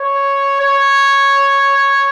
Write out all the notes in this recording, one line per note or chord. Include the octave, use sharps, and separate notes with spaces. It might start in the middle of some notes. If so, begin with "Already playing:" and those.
Already playing: C#5
C#5